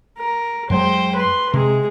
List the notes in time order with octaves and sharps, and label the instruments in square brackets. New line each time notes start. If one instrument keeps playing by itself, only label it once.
[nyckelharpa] A#4
[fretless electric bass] F#2 F#3 G#3 [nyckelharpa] C5 G5
[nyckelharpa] B4 C6
[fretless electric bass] C3 [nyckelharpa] G#3 G#4